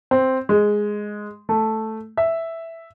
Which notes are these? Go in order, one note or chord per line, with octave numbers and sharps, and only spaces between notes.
C4
G#3
A3
E5